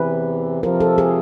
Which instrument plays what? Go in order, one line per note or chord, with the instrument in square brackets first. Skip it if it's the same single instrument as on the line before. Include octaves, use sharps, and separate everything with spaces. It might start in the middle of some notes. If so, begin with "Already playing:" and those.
Already playing: [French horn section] E2 C3 E3 [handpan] B4
[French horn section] F2 C3 F3 [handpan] A#4
[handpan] A4
G#4